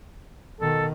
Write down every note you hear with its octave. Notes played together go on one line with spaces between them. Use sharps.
B2 D#3 A4